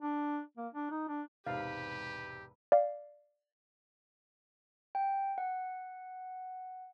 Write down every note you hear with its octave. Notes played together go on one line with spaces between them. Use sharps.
D4
A#3
D4
D#4
D4
E1 G#2 C3 G4 B4 F5
D5 F5
G5
F#5